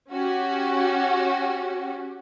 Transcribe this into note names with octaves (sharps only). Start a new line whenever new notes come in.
C#4 F#4 G4